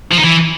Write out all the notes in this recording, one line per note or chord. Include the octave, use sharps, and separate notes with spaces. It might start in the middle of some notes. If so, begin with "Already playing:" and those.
F3
D#4
E3